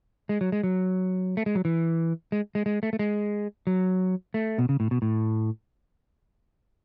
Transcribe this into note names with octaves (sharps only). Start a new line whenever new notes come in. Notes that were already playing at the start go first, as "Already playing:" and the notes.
G#3
F#3
G#3
F#3
A3
G#3
F#3
E3
G#3
G#3
G#3
A3
A3
G#3
F#3
A3
B2
C#3
A2
B2
A2